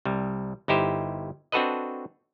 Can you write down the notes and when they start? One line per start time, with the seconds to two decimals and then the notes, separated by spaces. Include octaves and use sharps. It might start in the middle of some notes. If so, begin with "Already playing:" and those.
0.05 C2 G3
0.68 G1 D#4 E4 G4 C5
1.52 C4 D4 F#4 A4 B4 D#5